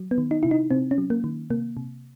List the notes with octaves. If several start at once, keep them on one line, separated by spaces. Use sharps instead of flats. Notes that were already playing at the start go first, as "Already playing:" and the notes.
Already playing: F#3
B3
D#3
D#4
C3 E4
D#4
C3 C4
C#4
F#3
A#3
D#3
C3 A#3
C3